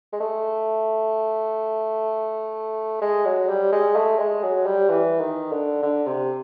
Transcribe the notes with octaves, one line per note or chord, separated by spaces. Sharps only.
G#3
A3
G#3
F#3
G3
G#3
A3
G#3
F#3
G3
E3
D#3
D3
D3
C3